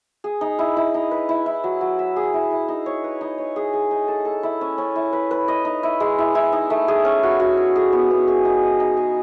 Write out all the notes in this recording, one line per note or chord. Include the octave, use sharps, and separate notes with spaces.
G#4
D#4
E4
E4
D#4
B4
E4
E4
F#3
F#3
E5
G#4
E4
E4
D#4
C#5
B4
D#4
C#5
G#4
G#4
D#4
A4
A4
E4
C#4
C#4
E4
B4
B4
D#5
D#4
E4
G#3
E4
E4
D#4
A3
G#4
C#4
F#4
F#4
C#5
G#4
B3
B3
G#4
D#4
D#5
D#4
G#4